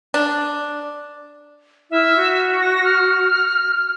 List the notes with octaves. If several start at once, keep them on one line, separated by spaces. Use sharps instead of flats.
D4
E4 E5 F6
F#4
A#6
F6